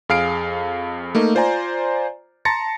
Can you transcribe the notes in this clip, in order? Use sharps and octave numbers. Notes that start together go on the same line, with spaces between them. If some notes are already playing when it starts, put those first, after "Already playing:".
F2 G#4 F5 F6 C7 D7
A3 A#3 D#4
F4 C5 D5 G#5 A#5
A5 A#5 C6 A6 A#6 C#7